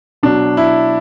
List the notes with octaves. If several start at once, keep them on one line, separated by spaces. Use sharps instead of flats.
B2 F#3 D4
E4